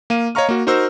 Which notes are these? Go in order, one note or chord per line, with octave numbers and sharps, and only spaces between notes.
A#3 F5 D#7
C#5 D#5 F5 A#5 C#6 F6
A#3 F#4
D#4 F#4 A#4 C5 A#5 E6